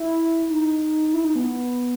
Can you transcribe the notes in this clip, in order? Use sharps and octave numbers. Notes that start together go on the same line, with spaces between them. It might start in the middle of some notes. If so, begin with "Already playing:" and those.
Already playing: E4
D#4
D#4
E4
D#4
B3